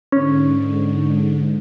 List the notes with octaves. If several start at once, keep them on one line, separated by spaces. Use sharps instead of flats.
G#2 D3 C#4